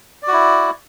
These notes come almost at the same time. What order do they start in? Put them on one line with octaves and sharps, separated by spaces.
D5 F#4 E4